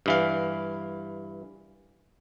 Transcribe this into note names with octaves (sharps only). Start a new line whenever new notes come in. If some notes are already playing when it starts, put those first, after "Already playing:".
G2 E3 F5